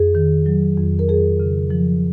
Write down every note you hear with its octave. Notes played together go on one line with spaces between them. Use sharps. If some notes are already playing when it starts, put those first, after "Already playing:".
Already playing: F2 G#4
D#3
F#3
F2
A#4
F2 G#4
C#3
F3